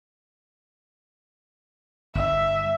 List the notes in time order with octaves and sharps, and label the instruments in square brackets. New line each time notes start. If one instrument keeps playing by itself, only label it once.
[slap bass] G1 [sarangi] E5